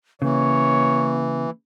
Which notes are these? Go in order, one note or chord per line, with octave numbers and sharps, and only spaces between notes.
C#3 E3 A#3 C#5